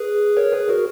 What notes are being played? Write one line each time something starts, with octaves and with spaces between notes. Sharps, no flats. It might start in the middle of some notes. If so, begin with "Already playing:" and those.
Already playing: G#4 B4
A#4 C#5
G#4 B4
F#4 A#4